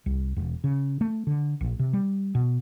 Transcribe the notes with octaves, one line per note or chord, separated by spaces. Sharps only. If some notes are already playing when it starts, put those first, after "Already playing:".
C2
E1
C#3
A3
D3
A#1
C3
G3
B2